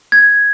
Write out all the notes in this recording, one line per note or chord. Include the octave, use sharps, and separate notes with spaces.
G#6